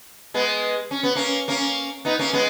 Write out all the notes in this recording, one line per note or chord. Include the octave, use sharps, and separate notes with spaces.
G#3 B3
C#4
B3
A#3 C#4
A#3 C#4
B3 D#4
A#3 C#4
G#3 B3